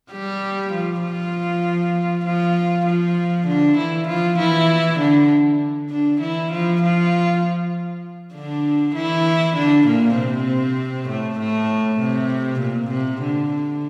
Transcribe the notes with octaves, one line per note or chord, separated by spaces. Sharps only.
G3 G4
F3 F4
F3 F4
F3 F4
F3 F4
D3 D4
E3 E4
F3 F4
E3 E4
D3 D4
D3 D4
E3 E4
F3 F4
F3 F4
D3 D4
E3 E4
D3 D4
A#2 A#3
C3 C4
A2 A3
A2 A3
C3
A#2
C3
D3